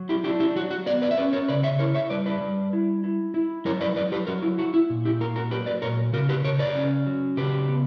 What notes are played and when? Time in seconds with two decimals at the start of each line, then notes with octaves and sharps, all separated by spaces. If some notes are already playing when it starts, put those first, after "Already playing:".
Already playing: F#3
0.09 E4 G4
0.24 D4 E4 G4
0.40 E4 G4
0.56 F#3 F#4
0.71 F#4
0.86 B3 B4 D5
1.02 B4 D5
1.11 E5
1.17 C#4 B4 D5
1.33 A#4 C#5
1.48 C#3 B4 D5
1.63 C#5 E5
1.79 E4 A#4 C#5
1.94 C#5 E5
2.10 G3 B4 D5
2.26 B4 D5
2.41 G3
2.73 E4
3.04 E4
3.34 E4
3.65 F#3 A#4 C#5
3.81 B4 D5
3.96 F#3 B4 D5
4.12 G4 B4
4.27 F#3 F#4 A#4
4.42 E4
4.58 E4 F#4
4.74 E4
4.90 A#2
5.05 E4 G4
5.20 A#3 F#4 A#4
5.36 F#4 A#4
5.51 F#3 G4 B4
5.66 B4 D5
5.82 A#2 A#4 C#5
6.13 C#3 F#4 A#4
6.29 G4 B4
6.44 C#3 A#4 C#5
6.59 B4 D5
6.75 C#4
7.06 F#3
7.37 C#3 G4 B4
7.69 B3